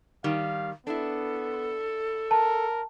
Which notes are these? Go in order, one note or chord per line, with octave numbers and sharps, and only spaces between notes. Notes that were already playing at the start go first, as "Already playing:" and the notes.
D#3 G3 F5
B3 D4 E4 A4
A#4 A5